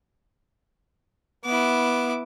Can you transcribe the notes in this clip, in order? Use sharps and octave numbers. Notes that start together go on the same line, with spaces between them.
B3 E4 D6